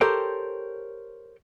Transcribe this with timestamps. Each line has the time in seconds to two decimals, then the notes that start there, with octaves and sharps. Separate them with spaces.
0.01 G4 A4 A#4 C5 C#5 G5